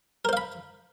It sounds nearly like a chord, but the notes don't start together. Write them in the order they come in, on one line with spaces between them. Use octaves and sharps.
A#4 C5 F5 B5